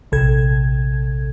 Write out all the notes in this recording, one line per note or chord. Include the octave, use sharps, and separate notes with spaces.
A#1 C3 A4 G#6